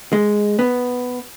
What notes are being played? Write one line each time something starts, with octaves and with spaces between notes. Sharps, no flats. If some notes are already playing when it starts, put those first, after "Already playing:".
G#3
B3